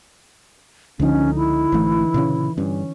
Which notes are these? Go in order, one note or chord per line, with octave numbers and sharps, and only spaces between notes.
C#2 D3 F3 C#4 D#4
E4
G#1 E3 A3
A#2 C#3 C#4
G2 C#4